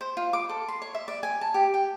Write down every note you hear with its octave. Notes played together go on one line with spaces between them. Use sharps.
C5
F4
D6
A4
C6
C#5
E5
D5
G#5
A5
G4
G5